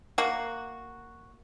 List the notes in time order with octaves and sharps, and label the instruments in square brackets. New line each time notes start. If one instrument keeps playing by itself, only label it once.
[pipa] A#3 F#4